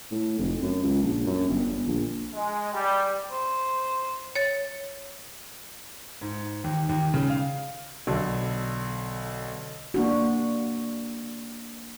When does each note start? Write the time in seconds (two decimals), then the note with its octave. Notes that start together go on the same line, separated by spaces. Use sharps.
0.11 A2
0.39 F1
0.62 F#2
0.84 C#2
1.03 A#1
1.27 F#2
1.48 G1
1.66 G1
1.87 A#1
2.35 G#3
2.73 G3
3.31 C5
4.35 C#5 A6
6.21 G#2
6.64 D#2
6.89 D#2
7.14 C#3
7.30 F5
8.07 B1 D3
9.94 A#3 D4 F#4